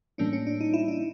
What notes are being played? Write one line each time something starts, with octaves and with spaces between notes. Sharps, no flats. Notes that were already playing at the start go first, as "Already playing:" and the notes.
A2 E3 G3 A#3 C#4 D4
C#4
D4
D#4
E4
D4